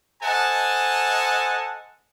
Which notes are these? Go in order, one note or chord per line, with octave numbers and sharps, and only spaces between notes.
A4 C5 D#5 F#5 G#5 A5